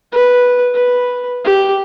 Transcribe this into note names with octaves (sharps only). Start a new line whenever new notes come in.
B4
B4
G4